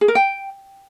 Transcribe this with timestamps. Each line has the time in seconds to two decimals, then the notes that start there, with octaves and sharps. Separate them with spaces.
0.01 G#4
0.08 A#4
0.15 G5